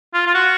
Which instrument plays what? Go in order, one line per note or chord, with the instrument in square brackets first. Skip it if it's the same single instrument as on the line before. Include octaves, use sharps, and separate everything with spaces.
[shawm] F4
F4
F#4